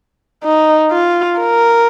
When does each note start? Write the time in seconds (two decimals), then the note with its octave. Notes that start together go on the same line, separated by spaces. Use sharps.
0.44 D#4
0.92 F4
1.40 A#4